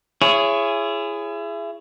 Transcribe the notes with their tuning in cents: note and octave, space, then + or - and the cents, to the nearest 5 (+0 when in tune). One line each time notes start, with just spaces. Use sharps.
E4 +35 G#4 +0 C#5 +0